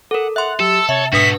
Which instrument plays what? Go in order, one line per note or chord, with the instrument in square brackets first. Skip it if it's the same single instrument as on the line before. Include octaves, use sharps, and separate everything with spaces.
[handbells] A4 A#4 [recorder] F#5
[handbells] E5 C6 [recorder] F#5 [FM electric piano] F#6
[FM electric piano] F#3 G4 [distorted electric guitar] A4 [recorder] E6
[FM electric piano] C3 [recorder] C#5 [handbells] E5
[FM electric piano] G#2 B2 [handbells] D4 B4 D#6 [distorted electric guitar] F#4 A4 [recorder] B6